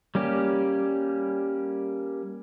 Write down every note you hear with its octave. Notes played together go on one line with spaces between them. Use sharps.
G3 A#3 C#4 G4